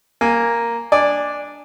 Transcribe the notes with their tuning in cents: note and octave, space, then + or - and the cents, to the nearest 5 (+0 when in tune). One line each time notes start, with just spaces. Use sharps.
A#3 +0 G#5 +0
D4 -5 D5 +0 G#5 -15